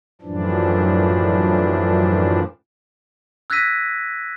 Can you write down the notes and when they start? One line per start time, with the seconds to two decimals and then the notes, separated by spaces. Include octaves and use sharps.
0.21 F#2 A2 E3 F3 D4
3.50 E6 F#6 G#6 A#6 B6 D#7